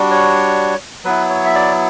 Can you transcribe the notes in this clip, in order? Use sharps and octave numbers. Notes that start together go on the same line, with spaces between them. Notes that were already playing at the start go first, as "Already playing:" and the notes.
Already playing: G3 D4 F#4
C#5
F#3 B3 E4 B4
C#5
E5
D5